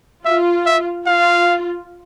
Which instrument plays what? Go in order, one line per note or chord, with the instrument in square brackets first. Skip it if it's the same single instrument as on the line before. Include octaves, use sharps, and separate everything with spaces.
[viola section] F4 [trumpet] E5
[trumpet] E5
[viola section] F4 [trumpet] F5